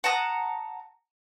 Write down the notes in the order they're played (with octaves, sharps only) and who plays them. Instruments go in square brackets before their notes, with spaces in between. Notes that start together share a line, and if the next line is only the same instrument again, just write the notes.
[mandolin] F#5 A5 A#5 D#6